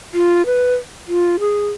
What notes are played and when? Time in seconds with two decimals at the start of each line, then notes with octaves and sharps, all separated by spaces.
0.14 F4
0.46 B4
1.08 F4
1.40 G#4